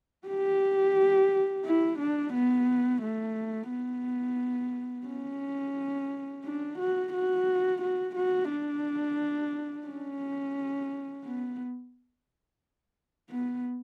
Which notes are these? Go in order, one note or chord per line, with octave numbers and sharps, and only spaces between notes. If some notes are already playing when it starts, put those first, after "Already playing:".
G4
E4
D4
B3
A3
B3
C#4
D4
F#4
F#4
F#4
F#4
D4
C#4
B3
B3